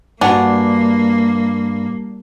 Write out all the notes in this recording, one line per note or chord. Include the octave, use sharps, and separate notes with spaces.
G2 A#3 D4 F#4 F#5 G#5